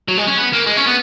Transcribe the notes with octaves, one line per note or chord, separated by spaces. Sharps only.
F#3
G#3
C#4
B3
A#3
G#3
C#4
B3